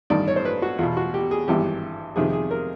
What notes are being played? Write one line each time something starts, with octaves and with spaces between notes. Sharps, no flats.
A1 G2 D#3 D5
C#5
C5
B4
F#4
E2 B2 F4
F#4
G4
G#4
G#1 G2 E3 G4
F2 C3 D#3 G#4
G#4
A#4